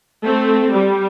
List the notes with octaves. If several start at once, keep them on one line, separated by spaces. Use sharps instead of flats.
A3 C4
G3